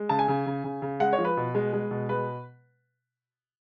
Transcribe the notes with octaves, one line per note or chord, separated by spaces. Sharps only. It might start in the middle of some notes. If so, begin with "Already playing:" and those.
Already playing: G#3
C#3 A5
G#5
C#3
C#3
C#3
C#3
G#3 F#5
C#5
F3
B4
B2
G#3
G#3
B2
G#3 B4